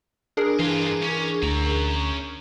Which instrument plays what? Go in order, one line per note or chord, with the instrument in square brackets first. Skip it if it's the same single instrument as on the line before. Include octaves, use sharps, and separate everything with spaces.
[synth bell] D4 G#4 A#4
[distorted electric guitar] G2 F4 [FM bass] E3
[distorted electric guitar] C#4
[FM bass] D2 [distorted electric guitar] C#4 A#5